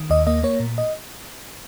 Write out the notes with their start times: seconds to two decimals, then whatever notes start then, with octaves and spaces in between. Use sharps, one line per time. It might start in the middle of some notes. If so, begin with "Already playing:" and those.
Already playing: D#3
0.10 D#2 D#5
0.27 A#3 D#5
0.43 A#3 C#5
0.60 A#2
0.78 D#5